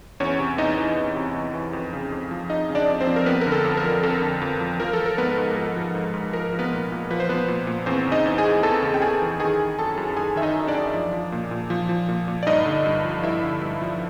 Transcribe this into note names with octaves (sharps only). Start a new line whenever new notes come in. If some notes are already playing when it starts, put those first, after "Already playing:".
E2 C#4 C#5
C3
E2 D#4 D#5
E3
E2
C3
E2
E3
F2
C#3
F2
F3
F2 D#4 D#5
C#3
D4 D5
F2
C4 C5
F3
A#4
F2 B3 B4
D3 A#4
A4
F2
A#4
F3
F2 A4
D3
F2
F3
F3 A#4
A4
F3
A#4
G#2 B3 B4
G#2
A#4
F3 A4
F3
G#2
G#2
F3 A#4
F3
B3 B4
A#2
A#2
F3 B4
C5
F3 B3 B4
A#2
A#2
E2 C4 C5
C#3
D#4 D#5
E2
G#4 G#5
E3
E2 A4 A5
C#3
G5
E2 G#4 G#5
E3
D#3 G#4 G#5
D#3
F#2 A4 A5
F#2
D#3 G#4 G#5
D#3 E5
D#4 D#5
F#2 D#5
D4 D5
F#2
F3
F3
A#2
A#2
F3
F3
A#2
A#2
D5
G2 D#4 D#5
D3
G2
F3
G2 E4 E5
D3
G2
F3